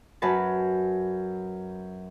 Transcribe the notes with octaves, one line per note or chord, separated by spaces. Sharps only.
F#2 F#3 B4 A5